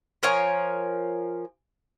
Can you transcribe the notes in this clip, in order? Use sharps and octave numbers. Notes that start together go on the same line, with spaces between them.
F3 A#4 C#5 G#5